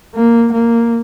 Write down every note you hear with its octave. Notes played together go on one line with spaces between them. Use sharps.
A#3
A#3